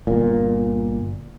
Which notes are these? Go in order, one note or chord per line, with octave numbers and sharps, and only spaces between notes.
G1 A#2